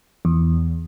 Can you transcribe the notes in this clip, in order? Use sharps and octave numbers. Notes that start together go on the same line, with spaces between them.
E2